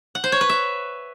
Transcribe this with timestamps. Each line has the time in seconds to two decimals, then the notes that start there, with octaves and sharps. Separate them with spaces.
0.15 F#5
0.24 C5
0.32 C#5
0.41 B4
0.49 E5